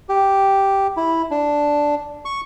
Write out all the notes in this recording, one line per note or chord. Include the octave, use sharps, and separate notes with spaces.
G4
E4
D4
C#6